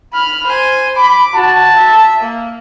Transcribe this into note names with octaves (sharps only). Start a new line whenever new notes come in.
B5 F6
C5 G#5
B5 D6
F#4 A5
E5
A#3